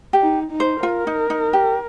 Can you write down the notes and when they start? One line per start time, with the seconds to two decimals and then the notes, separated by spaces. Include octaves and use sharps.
0.13 G4
0.21 D#4
0.52 D#4
0.60 C5
0.83 F4 A#4
1.07 D#4
1.30 D#4
1.53 G4